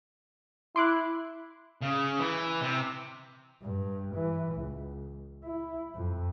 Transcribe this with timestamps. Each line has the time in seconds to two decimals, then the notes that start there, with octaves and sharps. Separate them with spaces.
0.76 E4 C6 D6 F#6
1.81 C#3
2.19 E3
2.62 C3
3.62 G2
4.16 E3
4.56 C#2
5.44 E4
5.95 F2